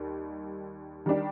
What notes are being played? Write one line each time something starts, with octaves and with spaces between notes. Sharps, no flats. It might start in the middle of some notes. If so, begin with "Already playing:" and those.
Already playing: D#2 D#3 G3
D#3 G3 D4 G4